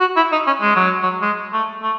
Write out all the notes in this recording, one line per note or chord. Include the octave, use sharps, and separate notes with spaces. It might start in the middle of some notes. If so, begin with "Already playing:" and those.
F#4
E4
D#4
C#4
G#3
F#3
F#3
G#3
A3
A3